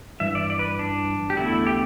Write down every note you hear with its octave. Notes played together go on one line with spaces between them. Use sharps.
G2 E3 E5
D5
D5
B4
D4
G4
E2 D3 A3 E4
G4